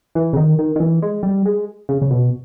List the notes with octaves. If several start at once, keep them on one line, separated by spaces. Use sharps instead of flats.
E3
C#3
D#3
D#3
D#3
E3
G#3
G3
G#3
C#3
C#3
B2